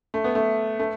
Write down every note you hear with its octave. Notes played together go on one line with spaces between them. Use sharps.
A3
B3
A3
A3